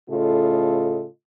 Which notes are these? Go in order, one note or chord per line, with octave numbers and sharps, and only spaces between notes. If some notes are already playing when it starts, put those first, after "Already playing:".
A2 C#3 F4 A4 D#5